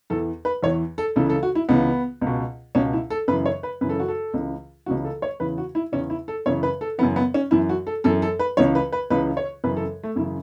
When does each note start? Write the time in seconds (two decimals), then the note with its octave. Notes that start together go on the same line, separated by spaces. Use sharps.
0.10 E2 E3 A4
0.45 B4
0.63 E2 E3 C#5
0.98 A4
1.16 C#2 C#3 E3 A4
1.30 A4
1.43 F#4
1.55 E4
1.69 C#2 C#3 E3 B3
2.21 C#2
2.27 B2
2.75 C#2 B2 C#4
2.93 E4
3.10 A4
3.28 F#2 C#3 E3 B4
3.46 C#5
3.63 B4
3.81 F#2 C#3 E3 B4
3.89 A4
4.00 F#4
4.08 A4
4.34 C#2 C#3 E3
4.86 C#2 C#3 E3 F#4
5.04 A4
5.22 C#5
5.40 E2 C#3 E3 B4
5.58 F#4
5.75 E4
5.92 E2 C#3 E3 C#4
6.10 E4
6.28 A4
6.46 F#2 C#3 E3 C#5
6.63 B4
6.81 A4
6.98 F#2 C#3 E3 B3
7.16 B3
7.34 C#4
7.51 F#2 E3 E4
7.69 F#4
7.87 A4
8.04 F#2 E3 A4
8.22 A4
8.39 B4
8.57 C#2 C#3 E3 C#5
8.75 B4
8.92 B4
9.10 C#2 C#3 E3 B4
9.37 C#5
9.64 F#2 C#3 E3 B4
9.77 A4
10.04 A3
10.16 F#2 C#3 E3 E4